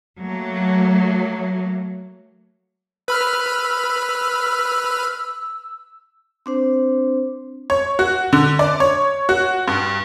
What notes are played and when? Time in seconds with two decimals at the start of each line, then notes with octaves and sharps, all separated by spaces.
0.20 F#3 A3 A#3
3.08 B4 B5 E6 F6
6.46 C4 D4 C5
7.70 C#5
7.99 F#4
8.33 D3
8.59 D5
8.80 C#5
9.29 F#4
9.67 G2